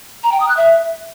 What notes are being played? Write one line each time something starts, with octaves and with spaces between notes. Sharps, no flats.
A#5
G5
D#6
F#6
E5